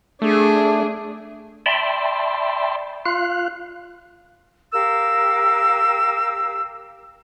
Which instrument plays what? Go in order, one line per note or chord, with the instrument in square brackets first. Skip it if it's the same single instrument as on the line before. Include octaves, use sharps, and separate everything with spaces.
[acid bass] A3 [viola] D4 G#4
[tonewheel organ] D5 E5 G5 A5 B5 C6
F4 F5 F#6
[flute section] G4 A#4 F5 E6